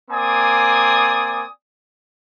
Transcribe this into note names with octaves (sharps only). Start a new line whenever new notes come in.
A#3 C4 D5 G#5 D#6